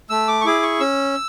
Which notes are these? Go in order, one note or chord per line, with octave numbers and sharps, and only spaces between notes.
A3 E6
D6
C#6
E4 G#4 D6
C#6
C#4 E6